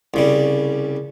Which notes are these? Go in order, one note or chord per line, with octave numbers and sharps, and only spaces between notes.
C2 C#3 G3